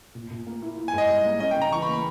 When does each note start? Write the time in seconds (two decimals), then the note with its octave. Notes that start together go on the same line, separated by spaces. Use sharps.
0.15 A#2
0.31 A#2
0.47 A#3
0.62 E4
0.78 E4
0.88 G#5
0.93 G#2 D#5
1.10 G3
1.26 A#3
1.40 C#4 D#5
1.51 G5
1.56 C#3
1.62 A#5
1.72 E3 C#6
1.82 B5
1.88 A#3
1.93 B5